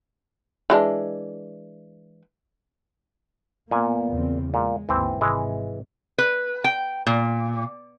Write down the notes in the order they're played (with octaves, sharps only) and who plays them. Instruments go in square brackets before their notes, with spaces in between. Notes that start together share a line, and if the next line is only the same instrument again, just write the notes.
[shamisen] E3 G#3 D4
[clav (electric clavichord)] A#2 G#5 [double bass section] A#3 B3
[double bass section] E2 C#3 C4
[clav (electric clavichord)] A#2 [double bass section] G#3
[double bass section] G#1 D#2 D3 [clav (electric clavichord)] E3 C4
[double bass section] G#2 C3 [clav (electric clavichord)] E3 G#3
[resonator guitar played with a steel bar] B4
G5
A#2